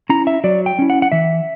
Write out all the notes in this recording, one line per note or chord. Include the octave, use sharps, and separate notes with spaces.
C#4 E4 A#5
E5
F#3 D5
G5
C#4 E4
F#5
F#5
E3 E5